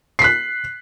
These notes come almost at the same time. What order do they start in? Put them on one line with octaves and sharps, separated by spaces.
C7 B6 F#6